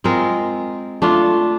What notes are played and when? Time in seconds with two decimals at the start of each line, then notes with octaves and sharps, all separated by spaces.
0.04 G#3 C4 F4 A#4
1.02 A3 D4 F4